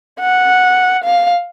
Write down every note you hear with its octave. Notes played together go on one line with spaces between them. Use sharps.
F#5
F5